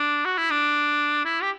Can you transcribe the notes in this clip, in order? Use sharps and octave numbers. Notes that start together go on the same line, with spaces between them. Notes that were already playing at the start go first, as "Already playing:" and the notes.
Already playing: D4
F#4
E4
D4
E4
G4